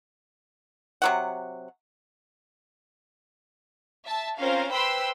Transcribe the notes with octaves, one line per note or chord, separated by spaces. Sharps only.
C3 F#3 F#5
E5 A5
C4 C#4 F4 A#4 C5 F5
B4 C5 G5 B5 C6 E6